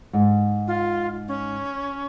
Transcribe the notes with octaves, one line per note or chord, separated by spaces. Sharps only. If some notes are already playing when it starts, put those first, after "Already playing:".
G#2
F4
C#4